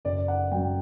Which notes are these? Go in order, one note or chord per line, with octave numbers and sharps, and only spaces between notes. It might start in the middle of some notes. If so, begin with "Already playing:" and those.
F#1 D5
F#5
F#2 F#3 G5